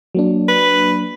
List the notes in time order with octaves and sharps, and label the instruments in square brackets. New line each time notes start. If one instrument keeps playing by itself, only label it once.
[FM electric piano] F#3 A#3 D4
[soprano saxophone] B4